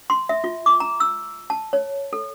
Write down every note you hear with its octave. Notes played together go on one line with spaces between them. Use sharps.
C6
E5
F4
D6
A#5
E6
A5
C#5
A4